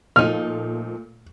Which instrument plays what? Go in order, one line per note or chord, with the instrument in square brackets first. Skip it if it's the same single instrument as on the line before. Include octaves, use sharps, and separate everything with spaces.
[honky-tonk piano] A#2 A3 [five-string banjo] F3 D#4 [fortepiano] F6